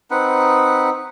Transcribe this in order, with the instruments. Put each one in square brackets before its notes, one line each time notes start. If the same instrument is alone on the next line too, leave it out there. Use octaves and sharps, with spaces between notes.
[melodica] C4 D#4 B4 F#5